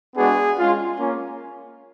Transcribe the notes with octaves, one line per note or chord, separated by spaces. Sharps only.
G#3 B3 D4 F#4 G#4
G#3 C#4 F4
A#3 C#4